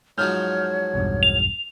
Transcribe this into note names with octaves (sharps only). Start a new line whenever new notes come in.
G#2 F3 F#3 C#5 F6 G6
B1 E2 G2
F7